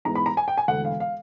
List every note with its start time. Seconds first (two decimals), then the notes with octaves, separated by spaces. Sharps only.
0.05 G#2 E3 G#3 B3 A#5
0.15 B5
0.26 A#5
0.37 G#5
0.48 G5
0.58 G#5
0.68 E1 D2 D3 F#5
0.85 F5
1.00 F5